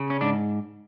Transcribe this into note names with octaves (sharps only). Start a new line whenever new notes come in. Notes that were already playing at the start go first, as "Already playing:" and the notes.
Already playing: C#3
C#4
G#2 D4